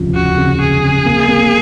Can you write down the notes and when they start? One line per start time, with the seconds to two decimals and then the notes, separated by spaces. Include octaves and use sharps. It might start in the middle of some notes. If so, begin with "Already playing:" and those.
Already playing: F1 D#2 C#3 F3
0.14 C#3 F#4
0.37 C#3
0.60 C#3 G#4
0.82 C#3
1.05 A#3
1.28 A#3